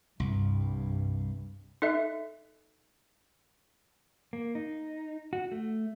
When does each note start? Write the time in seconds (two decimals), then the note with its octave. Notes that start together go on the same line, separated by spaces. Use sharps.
0.20 C2 G2
1.82 D#4 A4 D#5 E5
4.33 A#3
4.55 D#4
5.33 F#4
5.52 A3